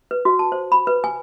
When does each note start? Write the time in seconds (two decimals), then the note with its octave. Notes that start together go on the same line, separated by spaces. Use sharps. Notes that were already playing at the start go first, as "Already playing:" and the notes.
0.11 B4
0.25 F#4
0.39 A5
0.52 C5
0.72 B5
0.87 B4
1.04 G#5